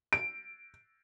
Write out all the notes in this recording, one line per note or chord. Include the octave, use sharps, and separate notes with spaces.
D7